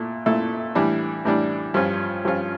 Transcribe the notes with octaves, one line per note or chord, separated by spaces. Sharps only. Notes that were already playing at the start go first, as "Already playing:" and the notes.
Already playing: A#2 A3 E4 A4
A#2 A3 E4 A4
A2 E3 G3 D4
A2 E3 G3 D4
G2 F3 C#4 F4
G2 F3 C#4 F4